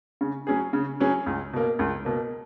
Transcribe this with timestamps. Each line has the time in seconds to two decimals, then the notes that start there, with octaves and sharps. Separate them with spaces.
0.21 C#3
0.47 F#3 C#4 G#4
0.73 C#3
1.00 F#3 C#4 G#4
1.26 C#2
1.53 B2 A#3
1.79 C#2
2.05 B2 A#3